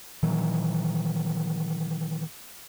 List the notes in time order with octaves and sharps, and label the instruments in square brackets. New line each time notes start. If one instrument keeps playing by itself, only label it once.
[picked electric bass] A#2 D#3 E3 F#3